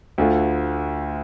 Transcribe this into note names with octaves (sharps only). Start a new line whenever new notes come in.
D2 D3 A3 F4